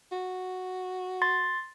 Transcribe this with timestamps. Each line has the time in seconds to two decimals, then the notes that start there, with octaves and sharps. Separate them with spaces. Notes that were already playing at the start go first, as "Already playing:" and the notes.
0.12 F#4
1.22 C6 A6